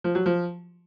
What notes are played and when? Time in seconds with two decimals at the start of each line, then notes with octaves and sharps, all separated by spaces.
0.04 F3
0.15 F#3
0.26 F3